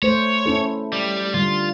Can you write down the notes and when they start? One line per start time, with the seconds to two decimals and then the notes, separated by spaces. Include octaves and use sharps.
0.03 A3 C5 C#5
0.46 C#4 E4 A4
0.93 G3
1.34 D3 G3 F4